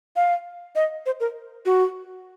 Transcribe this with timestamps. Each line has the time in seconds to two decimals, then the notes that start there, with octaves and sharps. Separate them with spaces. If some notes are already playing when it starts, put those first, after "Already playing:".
0.16 F5
0.75 D#5
1.06 C5
1.20 A#4
1.66 F#4